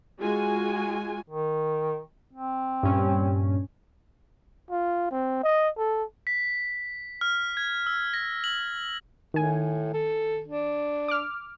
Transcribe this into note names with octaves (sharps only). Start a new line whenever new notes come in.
G#3 F4 F#4 G#5
D#3
C4
G2 A#2 C#4
F4
C4
D#5
A4
B6
F6
G#6
E6
A#6
F#7
A2 D#3 G#5
A4
D4
D6 F6